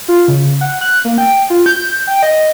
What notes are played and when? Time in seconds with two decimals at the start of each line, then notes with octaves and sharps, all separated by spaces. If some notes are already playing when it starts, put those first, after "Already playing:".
0.08 F4
0.28 C#3
0.61 F#5
0.81 F#6
1.05 A#3
1.18 G5
1.50 F4
1.66 G6
2.07 G5
2.23 D#5